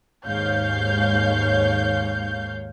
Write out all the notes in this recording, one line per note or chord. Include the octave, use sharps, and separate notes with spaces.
D#2 G#2 C#5 F5 G6